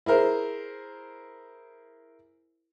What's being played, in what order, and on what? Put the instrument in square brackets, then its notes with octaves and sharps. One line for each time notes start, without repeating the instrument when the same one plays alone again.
[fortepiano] E4 G#4 A#4 C5